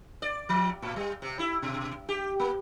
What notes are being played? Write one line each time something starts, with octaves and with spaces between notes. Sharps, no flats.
D5
F3
A2
G3
C3
E4
B2
G4
A#3